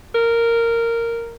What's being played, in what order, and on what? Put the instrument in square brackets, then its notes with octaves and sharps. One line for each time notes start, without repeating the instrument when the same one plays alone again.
[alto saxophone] A#4